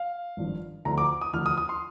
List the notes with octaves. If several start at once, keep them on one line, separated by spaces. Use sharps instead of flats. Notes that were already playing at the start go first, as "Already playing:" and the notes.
Already playing: F5
G#1 G2 F3
D2 D3 F3 A#5
D6
D#6
D2 D3 F3 F6
D#6
D#6
C6